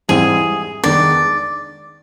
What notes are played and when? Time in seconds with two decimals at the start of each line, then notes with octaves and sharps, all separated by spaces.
0.09 G#2 E3 G3 C4 E4 G#4
0.84 D#3 G#3 B3 D4 D5